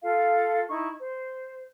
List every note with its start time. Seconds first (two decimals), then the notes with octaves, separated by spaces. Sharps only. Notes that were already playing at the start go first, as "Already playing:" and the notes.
0.02 F4 A4 F5
0.67 D#4 E4 C#6
0.98 C5